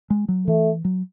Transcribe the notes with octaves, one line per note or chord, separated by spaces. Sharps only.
G#3
F#3
E3 A3
F#3